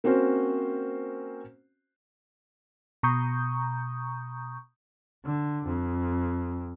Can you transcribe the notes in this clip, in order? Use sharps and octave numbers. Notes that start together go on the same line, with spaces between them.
A#3 C4 C#4 F#4 C5
B2 A#5 C#6 D#6 G6
D3
F2